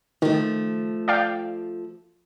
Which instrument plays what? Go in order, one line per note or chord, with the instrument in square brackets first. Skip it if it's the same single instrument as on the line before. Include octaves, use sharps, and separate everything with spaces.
[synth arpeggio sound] D#3 [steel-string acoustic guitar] F3 A3
[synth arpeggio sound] D5 F5 G5